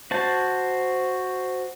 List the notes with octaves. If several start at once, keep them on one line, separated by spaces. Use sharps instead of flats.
F#4 C5 A5